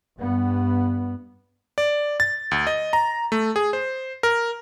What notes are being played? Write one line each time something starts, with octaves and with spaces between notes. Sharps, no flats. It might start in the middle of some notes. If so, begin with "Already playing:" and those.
G2 B3
D5
A6
D2
D#5
A#5
A3
G#4
C5
A#4